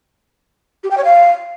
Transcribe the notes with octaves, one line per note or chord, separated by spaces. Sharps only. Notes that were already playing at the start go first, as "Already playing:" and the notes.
G4
G5
C#5
F5